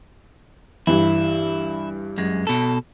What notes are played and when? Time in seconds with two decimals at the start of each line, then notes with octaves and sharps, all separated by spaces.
0.87 G2 E3 E4
2.18 F#2 G#3
2.47 B2 A4